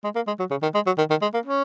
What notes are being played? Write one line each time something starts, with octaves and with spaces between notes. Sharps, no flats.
G#3
A#3
G#3
F#3
C#3
D#3
G#3
F#3
D#3
D#3
G#3
A#3
C#4